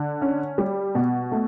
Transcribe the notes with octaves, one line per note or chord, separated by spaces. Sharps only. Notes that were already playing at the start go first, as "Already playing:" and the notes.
Already playing: D3
C#4
G3
B2
A3